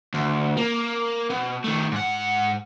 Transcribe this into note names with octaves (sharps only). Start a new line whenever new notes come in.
D2
A#3
B2
D#3 A3
G#2 F#5